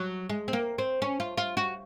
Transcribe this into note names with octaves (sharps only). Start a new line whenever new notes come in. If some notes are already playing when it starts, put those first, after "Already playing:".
Already playing: F#3
G#3
C4
A#3
C4
C#4
F4
F4
F#4